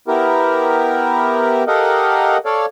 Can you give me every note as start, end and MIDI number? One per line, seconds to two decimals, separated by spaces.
0.08 1.64 59
0.08 1.64 64
0.08 1.64 67
0.08 1.64 70
1.67 2.37 67
1.67 2.37 69
1.67 2.37 70
1.67 2.37 75
1.67 2.37 77
1.67 2.37 78
2.45 2.65 69
2.45 2.65 73
2.45 2.65 74
2.45 2.65 77